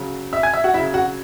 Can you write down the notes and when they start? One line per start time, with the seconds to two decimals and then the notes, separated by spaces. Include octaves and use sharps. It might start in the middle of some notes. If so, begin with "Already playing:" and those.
Already playing: C#3 F#3
0.33 E5 E6
0.43 G#5 G#6
0.53 E5 E6
0.64 F#4 F#5
0.74 F#3 E4 E5
0.78 C#3
0.94 F#4 F#5